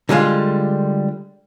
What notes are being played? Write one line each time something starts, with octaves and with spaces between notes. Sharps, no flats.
D3 G3 G#3 F4